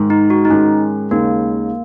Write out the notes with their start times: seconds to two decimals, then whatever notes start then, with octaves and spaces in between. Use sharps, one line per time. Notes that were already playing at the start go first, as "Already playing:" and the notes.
Already playing: G#2 D#3 G#3
0.10 D#4
0.30 F#4
0.45 D#4
0.50 G#2 D#3 G#3 C#4
1.11 D#2 C#3 G#3 A#3 D#4